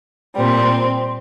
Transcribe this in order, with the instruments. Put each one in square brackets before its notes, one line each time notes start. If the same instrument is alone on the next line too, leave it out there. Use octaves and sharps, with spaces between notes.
[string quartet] A#2 G3 C4